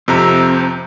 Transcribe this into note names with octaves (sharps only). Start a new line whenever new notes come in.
F2 C3 C4 A#5